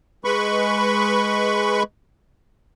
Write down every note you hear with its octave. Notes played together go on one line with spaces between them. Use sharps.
G#3 B4 B5 C#6